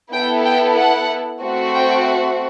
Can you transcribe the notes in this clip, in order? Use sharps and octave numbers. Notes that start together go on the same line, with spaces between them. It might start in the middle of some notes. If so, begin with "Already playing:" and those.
B3 E4 A4 G5
G5
F#5
A3 C4 F#4
G5